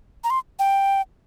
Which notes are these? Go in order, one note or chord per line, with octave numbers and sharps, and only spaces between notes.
A#5
C6
G5